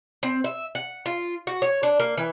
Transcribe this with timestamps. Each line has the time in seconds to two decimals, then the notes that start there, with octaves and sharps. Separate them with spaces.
0.23 C4
0.44 E5
0.75 F#5
1.06 F4
1.47 F#4
1.62 C#5
1.83 D4
2.00 A#3
2.17 E3